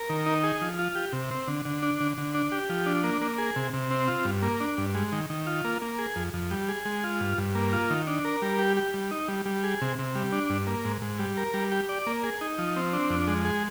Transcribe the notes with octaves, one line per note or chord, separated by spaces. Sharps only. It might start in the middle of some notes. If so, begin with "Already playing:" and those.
Already playing: A#4
D#3
D#4
G#4
F3
F4
G4
C3
C4
D3
D3
D4
D3
D3
D4
G4
F3
D4
A#3
A#3
G#4
C3
C3
C4
F4
G2
A#3
D4
G2
G#3
D#3
D#3
F4
A#3
A#3
G#4
F2
F2
G3
G#4
G#3
F4
G2
G2
A#3
F4
D#3
D4
A#4
G3
G4
G4
G3
D#4
G3
G3
G#4
C3
C3
G3
D4
G2
A#3
G#2
G#2
G3
A#4
G3
G4
D5
A#3
G#4
D#4
F3
C4
D4
F2
G#3
G#4